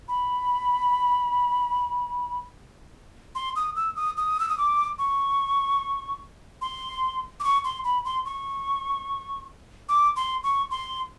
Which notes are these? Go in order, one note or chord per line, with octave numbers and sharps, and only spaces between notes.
B5
C6
D#6
E6
D#6
D#6
E6
D#6
D6
C#6
C6
D6
C#6
C6
B5
C6
C#6
D6
C6
C#6
C6